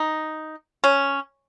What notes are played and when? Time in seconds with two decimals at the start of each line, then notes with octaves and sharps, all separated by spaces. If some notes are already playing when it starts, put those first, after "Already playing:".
Already playing: D#4
0.84 C#4